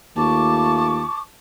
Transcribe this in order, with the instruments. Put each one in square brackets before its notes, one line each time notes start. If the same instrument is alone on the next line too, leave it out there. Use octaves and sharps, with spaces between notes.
[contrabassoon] D#2 [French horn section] A3 F4 [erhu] A5 [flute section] C#6 D6